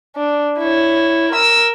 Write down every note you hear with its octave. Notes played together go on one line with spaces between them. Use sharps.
D4
E4 C#5
A#4 E6